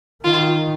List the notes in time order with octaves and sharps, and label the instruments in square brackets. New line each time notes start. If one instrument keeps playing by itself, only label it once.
[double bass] D#3 [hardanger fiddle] F4